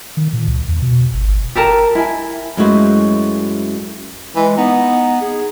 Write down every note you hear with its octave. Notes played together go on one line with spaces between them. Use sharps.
D#3
A#2
C#2
E2
B2
G1
G1
G4 A4 A#4 A5
E4 G#5
F#2 G#3 A3 E4 F#4 C5
E3 G#3
B3 D#4
G#4